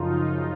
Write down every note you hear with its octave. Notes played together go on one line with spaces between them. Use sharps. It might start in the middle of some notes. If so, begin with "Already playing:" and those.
Already playing: F#2 C#3 F3 D#4 F4